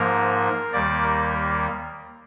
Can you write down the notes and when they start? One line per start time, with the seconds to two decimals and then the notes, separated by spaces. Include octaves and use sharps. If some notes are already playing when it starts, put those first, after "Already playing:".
Already playing: G#2 F3 A#3 A#4
0.72 D#2 D#3 G3 A#3 D5
1.02 A#4